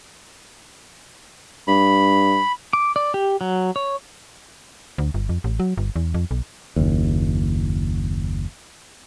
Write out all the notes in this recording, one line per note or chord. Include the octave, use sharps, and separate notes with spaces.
G2 B5
D6
D5
G4
F#3
C#5
D2
G1
F2
A1
F#3
G1
E2
F2
B1
F#1 D#2